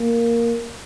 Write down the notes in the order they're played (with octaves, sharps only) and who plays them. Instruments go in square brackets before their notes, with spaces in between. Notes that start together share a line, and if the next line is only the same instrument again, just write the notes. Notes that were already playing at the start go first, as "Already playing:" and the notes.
Already playing: [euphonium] A#3